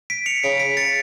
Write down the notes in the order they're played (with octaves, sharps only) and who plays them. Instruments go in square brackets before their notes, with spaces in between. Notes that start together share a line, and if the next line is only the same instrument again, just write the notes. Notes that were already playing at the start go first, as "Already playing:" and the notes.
[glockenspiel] B6 D7
C#7 F7
[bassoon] C#3 [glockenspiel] B6 D7
[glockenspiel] B6 D7
A6 C#7